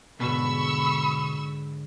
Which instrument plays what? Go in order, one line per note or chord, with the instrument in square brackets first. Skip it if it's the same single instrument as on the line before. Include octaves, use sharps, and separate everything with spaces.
[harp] G#2 D3 [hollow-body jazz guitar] B2 [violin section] B5 C#6 E6